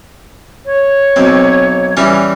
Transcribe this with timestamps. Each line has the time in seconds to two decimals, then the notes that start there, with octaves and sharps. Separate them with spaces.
0.66 C#5
1.16 B1 C4
1.97 E3 G3 C#4